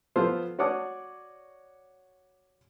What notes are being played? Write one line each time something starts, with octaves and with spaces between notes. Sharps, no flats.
F3 B3 F4 A4 C5
F#4 C#5 D5 F#5 D6 D#6